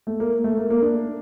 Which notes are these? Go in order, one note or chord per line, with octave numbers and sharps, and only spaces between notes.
A3
A#3
A3
A#3
A#3
D4